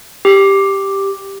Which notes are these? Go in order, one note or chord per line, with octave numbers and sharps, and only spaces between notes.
G4